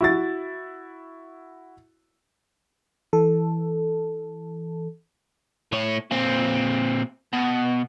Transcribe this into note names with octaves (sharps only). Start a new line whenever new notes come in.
E4 F#4 A6
E3 A4
A2 C#5
A#2 C4
B2